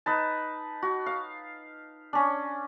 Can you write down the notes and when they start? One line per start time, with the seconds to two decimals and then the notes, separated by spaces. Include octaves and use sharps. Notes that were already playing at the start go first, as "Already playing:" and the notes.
0.06 D#4 B4 A5
0.83 F#4
1.06 F5
2.13 C#4 D4